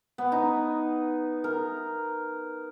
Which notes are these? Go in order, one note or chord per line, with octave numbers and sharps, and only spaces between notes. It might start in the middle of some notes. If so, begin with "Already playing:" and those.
B3
D#4
A#4